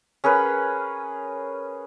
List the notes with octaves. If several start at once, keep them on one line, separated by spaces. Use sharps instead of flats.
C#4 G#4 A#4 B4